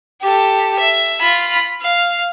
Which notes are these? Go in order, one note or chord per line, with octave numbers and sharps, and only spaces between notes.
G4 A4
E5
F4 B5
F5